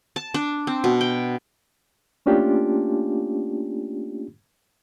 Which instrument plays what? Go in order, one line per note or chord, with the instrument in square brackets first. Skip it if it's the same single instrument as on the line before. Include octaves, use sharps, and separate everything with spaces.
[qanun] A5
D4
C4
B2
G5
[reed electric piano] A3 A#3 C#4 D4 F4 G4